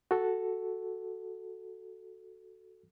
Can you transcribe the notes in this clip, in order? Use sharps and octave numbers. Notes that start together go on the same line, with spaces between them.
F#4 A4